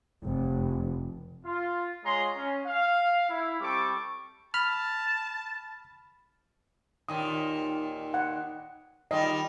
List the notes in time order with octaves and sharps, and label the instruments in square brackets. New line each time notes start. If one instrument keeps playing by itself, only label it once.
[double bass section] F1
[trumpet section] F4
G#3 F4 G#4 C#5 A#5 C6
C#4
F5
E4
G3 C4 A4 C#6 D6
[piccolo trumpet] A5 [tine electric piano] B5 F6
[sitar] D#2 A#2 D#3 [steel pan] D#6
[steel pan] F#5
[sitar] D#3 G3 F4 [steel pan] D#5